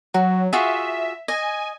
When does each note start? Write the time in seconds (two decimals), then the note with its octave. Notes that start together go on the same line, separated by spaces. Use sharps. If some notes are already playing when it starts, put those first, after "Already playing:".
0.14 F#3 F#4
0.53 F4 F#4 G#4 E5
1.28 D#5 G#5